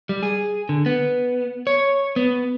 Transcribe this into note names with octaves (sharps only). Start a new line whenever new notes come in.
G3
G#4
D3
B3
C#5
B3